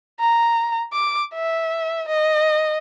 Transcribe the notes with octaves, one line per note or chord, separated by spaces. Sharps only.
A#5
D6
E5
D#5